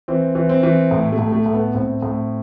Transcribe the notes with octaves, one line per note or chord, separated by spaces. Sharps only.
E3 C4
E3
C4
E3
A2
A3
A2
A3
A2
B3
A2 C4
A2